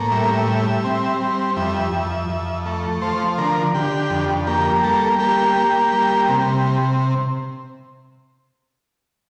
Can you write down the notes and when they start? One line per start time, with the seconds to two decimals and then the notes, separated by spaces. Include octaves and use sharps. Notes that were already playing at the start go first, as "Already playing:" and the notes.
Already playing: A2 A#3
0.12 G3 E5
0.47 G3
0.84 C4
1.20 G3
1.56 F2 E5
1.93 F2
2.29 F2
2.66 A3
3.02 F3 C5
3.38 D3 A#4
3.74 D3 G4
4.10 F2
4.47 A#3 G4
4.83 G3 A4
5.19 A#3 G4
5.56 A#3
5.92 G3
6.29 C3